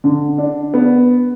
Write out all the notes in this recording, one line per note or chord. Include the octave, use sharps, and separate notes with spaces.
D3
D4
B3